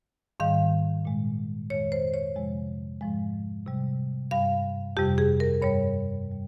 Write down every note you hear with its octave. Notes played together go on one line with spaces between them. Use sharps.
G#2 D#3 G3 F5
A#2 G#3
F2 D#3 G#3 C#5
C5
C#5
F2 C3 F3 G#3
G#2 F3 G#3
C3 G3
G2 G3 F5
F2 C3 G3 G4
G#4
A#4
G2 G3 C#5
G3